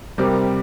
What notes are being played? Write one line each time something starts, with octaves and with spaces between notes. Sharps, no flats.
C3 G3 C4 G4 A#4